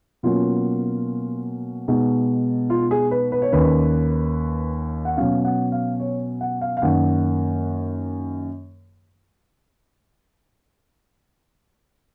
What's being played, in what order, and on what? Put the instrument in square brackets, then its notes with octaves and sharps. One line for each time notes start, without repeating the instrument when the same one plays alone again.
[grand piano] B2 F#3 A#3 C#4 F4
B2 G#3 D#4
F4
G#4
B4
B4
C#5
D#2 D#3 A#3 C#4 B4
F#5
B2 F#3 C#4 F5
F#5
F5
C#5
F#5
F5
F5
F#2 D#3 A#3 F#5